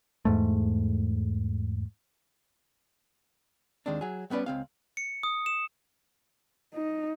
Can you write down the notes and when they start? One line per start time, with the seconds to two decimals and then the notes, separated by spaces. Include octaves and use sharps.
0.25 E2 G#2 A3
3.86 D#2 D#3 G#3 C4 D4
4.01 F#3 G#4
4.30 G3 B3 C#4 B4 D5
4.46 C#2 C4 F5
4.97 C#7
5.23 D#6
5.46 E7
6.74 D#4